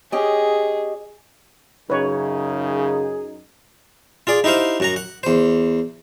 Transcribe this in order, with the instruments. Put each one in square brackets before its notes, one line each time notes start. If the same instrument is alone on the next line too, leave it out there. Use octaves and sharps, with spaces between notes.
[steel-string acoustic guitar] C#4 G4 D#5 [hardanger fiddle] G#4
[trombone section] F#2 D#4 [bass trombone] C#3 [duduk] G#4 [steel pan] B4 C#5
[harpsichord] F4 G#4 D5
D#4 E4 G4 C5 F5
F#2 F#4 A#5
F#5
E2 C5